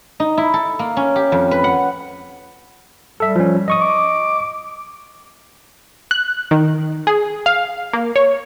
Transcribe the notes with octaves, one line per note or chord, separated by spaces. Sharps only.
D#4
E4
A4
A#3
C#4
G4
F2
B4
F#5
G3 A4 E5
F3 C#4
D#5 C#6 D#6
D6
F#6
D#3
G#4
F5
A#3
C#5